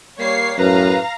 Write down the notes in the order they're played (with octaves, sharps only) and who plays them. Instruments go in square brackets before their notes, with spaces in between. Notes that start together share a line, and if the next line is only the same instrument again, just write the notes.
[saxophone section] G3 A#3 [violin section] C#5 C7
[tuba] F#2 [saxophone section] A2 B4 [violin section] F5 A#5